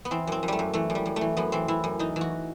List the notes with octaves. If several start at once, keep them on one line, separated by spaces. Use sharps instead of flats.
B3
E3 C4
F#2 C4
F#2
G3 A3
F#2
E3 A3
F#2
G3
F#2
A3
E3
F#2 B3
E3 C4
E3 E4
F#2
E3 D#4
E3
F#4